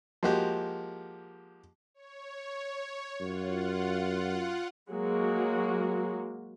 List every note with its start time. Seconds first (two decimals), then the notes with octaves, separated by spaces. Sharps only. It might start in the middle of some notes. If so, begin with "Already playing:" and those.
0.23 F3 G#3 A#3 F#4 G4
1.94 C#5
3.21 F#2 F4 F#5
4.91 F#3 G#3 A#3 F#4